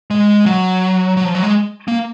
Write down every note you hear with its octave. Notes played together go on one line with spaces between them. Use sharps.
G#3
F#3
F#3
F3
F#3
G#3
A#3